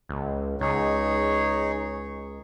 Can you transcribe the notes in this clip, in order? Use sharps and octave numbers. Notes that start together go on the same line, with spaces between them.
C#2
C#2 D#4 G#4 C#5